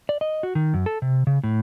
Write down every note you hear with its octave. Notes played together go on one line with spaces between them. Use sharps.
D5
D#5
F#4
D#3
F#2
A4
C3
C#3
A2